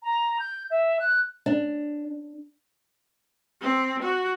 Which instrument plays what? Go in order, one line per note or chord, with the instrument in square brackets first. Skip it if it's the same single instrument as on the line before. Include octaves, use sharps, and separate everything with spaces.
[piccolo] A#5
G6
E5
F#6
[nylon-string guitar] D4
[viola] C4
F#4